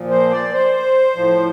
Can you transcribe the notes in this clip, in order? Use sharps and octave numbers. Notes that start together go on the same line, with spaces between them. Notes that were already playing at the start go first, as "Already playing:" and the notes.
Already playing: A#2 F3
C5
D5
C5
A2 F3